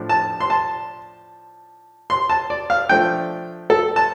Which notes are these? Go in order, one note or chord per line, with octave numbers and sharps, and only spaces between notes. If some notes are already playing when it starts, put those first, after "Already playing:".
Already playing: A2 F3 D4
A5
C6
A5
C6
A5
D5
F5
F3 A3 D4 G5
A4
A5